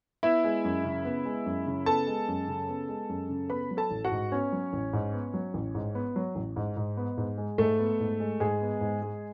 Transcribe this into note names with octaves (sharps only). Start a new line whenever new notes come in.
B3 E4 E5
G#3
F#2
C#3
B3
G#3
F#2
C#3
B3 A4 A5
G#3
F#2
C#3
B3
G#3
F#2
C#3
B3 B4 B5
F#3
A4 A5
A1
F#4 F#5
G#2
B3 C#4 C#5
F#3
A1
G#2
B3
F#3
A1
G#2
B3
F#3
A1
G#2
G#2
B3
G#2
G#3
G#2 A3 A4
B3
G#2
G#3
G#2 G#3 G#4
B3
G#2
G#3